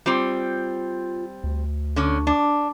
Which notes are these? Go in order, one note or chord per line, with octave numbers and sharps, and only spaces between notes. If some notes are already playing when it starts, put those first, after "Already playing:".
G3 C4 F4
D2
D3 C#4
D4